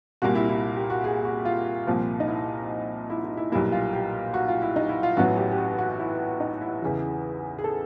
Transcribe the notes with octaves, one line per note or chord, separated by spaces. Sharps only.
C2 A#2 G3 A#3 F#4
E4
E4
G4
F#4
G#4
F#4
F4
C2 A#2 F3 A#3
D#4
E4
E4
E4
E4
B1 A#2 G3 A#3 E4
F4
G4
F#4
F4
E4
D#4
E4
F4
A1 A2 F#3 B3 F#4
G4
G4
F#4
F#4
E4
D#4
E4
E2 C#3 E3
G#4
A4